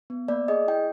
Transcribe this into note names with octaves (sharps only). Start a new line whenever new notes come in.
B3
A#3 D5
G#4 D#5
E4 G5